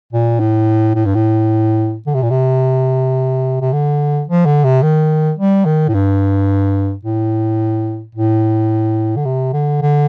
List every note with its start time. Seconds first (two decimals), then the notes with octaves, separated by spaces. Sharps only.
0.13 A#2
0.40 A2
0.95 A2
1.06 G2
1.15 A2
2.07 D3
2.14 C3
2.23 A#2
2.30 C3
3.61 C3
3.73 D3
4.28 F3
4.46 D3
4.64 C3
4.83 D#3
5.39 G3
5.66 D#3
5.88 A2
5.94 G2
7.05 A2
8.15 A2
9.17 D3
9.25 C3
9.53 D3
9.82 D3